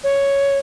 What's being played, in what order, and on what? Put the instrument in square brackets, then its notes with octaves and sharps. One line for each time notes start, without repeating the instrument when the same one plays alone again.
[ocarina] C#5